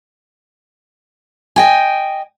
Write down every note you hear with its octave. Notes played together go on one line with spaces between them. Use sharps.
D#5 G5 G#5